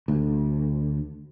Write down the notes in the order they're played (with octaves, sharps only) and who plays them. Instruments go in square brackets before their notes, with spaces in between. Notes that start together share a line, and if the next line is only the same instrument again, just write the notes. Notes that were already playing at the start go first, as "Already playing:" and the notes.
[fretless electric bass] D2